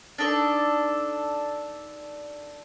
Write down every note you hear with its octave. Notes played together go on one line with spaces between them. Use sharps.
D4 D#4 A4 D5